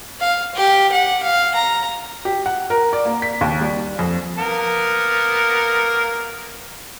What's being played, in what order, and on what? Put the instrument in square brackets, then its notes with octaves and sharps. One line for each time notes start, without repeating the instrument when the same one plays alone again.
[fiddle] F5
G4
F#5
F5
A#5
[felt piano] G4
F#5
A#4
D5
A#3
B6
D#2
G3
F2
[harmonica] A#3 B3 A#4